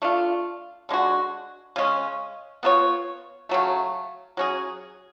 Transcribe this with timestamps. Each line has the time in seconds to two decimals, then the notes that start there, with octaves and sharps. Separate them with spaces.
0.02 A3 D4 F4
0.89 D3 G#3 D4 F#4
1.76 C#3 G#3 C#4
2.63 B3 F4 A4 C#5
3.49 C#3 F#3 A3
4.37 F#3 C#4 G#4